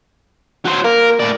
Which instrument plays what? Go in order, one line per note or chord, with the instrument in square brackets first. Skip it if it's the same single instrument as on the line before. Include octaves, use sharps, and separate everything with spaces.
[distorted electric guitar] F#3 C5
[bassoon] A#3 [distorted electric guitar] A#4
[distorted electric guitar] A2 D5